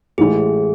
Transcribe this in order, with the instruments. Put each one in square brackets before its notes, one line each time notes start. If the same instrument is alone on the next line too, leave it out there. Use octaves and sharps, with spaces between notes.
[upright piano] A1 A2 E3 G#3 [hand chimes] G#4